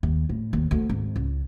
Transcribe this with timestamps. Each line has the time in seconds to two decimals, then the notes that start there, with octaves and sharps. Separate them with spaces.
0.03 D#2
0.29 A2
0.53 D#2
0.71 D2
0.89 G#1
1.16 C#2